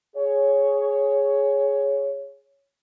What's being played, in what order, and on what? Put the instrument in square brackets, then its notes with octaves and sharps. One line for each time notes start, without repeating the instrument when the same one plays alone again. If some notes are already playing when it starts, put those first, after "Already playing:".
[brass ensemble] G#4 C#5